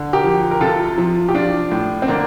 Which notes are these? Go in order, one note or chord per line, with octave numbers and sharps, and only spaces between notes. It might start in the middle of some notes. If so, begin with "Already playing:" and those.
Already playing: D3
G4 A#4
F3
A#4
C3 F4 A4
F3
G4
F3 D4 F4
A2
C4
D3 A#3 D4